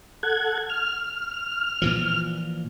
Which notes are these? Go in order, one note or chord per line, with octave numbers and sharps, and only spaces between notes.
A4 F#5 G#6
F6
A#2 E3 F3